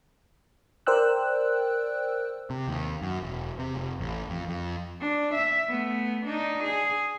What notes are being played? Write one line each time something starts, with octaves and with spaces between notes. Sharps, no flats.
A#4 C5 D5 G5 E6 F#6
C3
D#2
F#2
E1
C3
F1
A1
F2
F2
D4
E5
A3 B3
D4 D#4
G#4